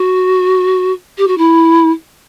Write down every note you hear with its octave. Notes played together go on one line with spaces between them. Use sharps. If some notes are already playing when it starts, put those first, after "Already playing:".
Already playing: F#4
G4
F#4
E4